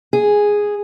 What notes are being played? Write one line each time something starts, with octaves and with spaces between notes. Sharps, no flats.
G#4